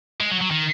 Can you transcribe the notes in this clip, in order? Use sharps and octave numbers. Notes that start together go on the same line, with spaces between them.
G#3
F#3
F#3
D#3